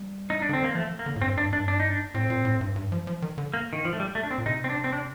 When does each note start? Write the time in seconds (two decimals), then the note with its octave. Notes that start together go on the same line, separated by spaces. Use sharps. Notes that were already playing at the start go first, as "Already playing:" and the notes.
Already playing: G3
0.30 D#4
0.42 D4
0.49 D3 C4
0.62 D#3 A#3
0.75 F3 A3
0.99 A#3
1.06 D3
1.16 A2
1.22 G2 C4
1.38 G2 D4
1.52 G2 D4
1.68 D4
1.80 D#4
1.90 D4
2.14 A2 C4
2.30 A#2
2.45 A2
2.61 G2
2.76 G2
2.92 F3
3.07 F3
3.22 D#3
3.38 D3
3.54 A#3
3.73 D#3
3.85 F3
3.93 A3
4.00 G3
4.15 A3
4.23 D4
4.31 C4
4.38 A#2
4.46 C3 D#4
4.64 C4
4.70 D4
4.84 C4
4.93 D4